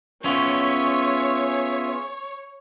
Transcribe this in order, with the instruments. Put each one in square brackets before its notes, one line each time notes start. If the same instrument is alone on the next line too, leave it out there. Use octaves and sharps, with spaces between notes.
[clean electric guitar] B3 C#4 [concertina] F4 G#4 E5 [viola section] C#5